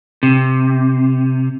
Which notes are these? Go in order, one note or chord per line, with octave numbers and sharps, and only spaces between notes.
C3